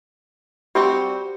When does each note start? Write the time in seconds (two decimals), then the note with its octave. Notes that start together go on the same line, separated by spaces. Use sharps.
0.75 G3 C4 F#4 G4